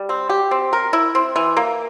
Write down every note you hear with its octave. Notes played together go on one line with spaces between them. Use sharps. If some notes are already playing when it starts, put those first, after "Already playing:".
Already playing: G3
C4
G4
C4
A#4
E4
C4
E3
A#3